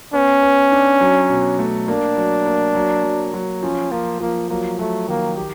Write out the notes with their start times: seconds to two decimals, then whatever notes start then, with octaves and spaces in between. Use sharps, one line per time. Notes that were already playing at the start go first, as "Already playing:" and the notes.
0.13 B3 C#4
0.42 B3
0.72 D4
1.01 F#3
1.29 B2
1.59 A3
1.87 A#3 D4
2.17 F#3
2.46 A#3
2.75 F#3
3.04 F#3
3.34 F#3
3.63 F3 C#4
3.92 F3 A#3
4.20 F3 A#3
4.50 F#3 A#3
4.79 F#3 A3
5.08 D#3 A#3
5.37 G4